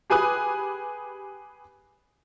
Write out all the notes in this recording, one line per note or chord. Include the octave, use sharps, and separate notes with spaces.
G4 G#4 B4 G#5 D#6 F#6